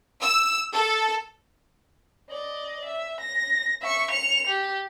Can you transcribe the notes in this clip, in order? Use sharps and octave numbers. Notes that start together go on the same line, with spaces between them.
E6
A4
D5 D#5
E5
A#6
E5 C#6
C#7 F7
G4